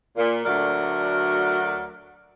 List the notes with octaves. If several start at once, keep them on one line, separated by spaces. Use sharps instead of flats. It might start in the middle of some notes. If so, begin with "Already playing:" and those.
A#2
D2 F#3 A3 F#4 A#4 D5